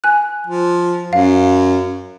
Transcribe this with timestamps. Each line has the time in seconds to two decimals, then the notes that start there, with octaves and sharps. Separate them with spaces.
0.04 G#5 F#6
0.47 F3
1.13 F#2 F5